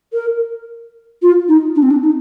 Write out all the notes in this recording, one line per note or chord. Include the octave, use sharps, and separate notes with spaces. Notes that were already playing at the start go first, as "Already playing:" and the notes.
A#4
F4
D#4
D4
C4
D4
D#4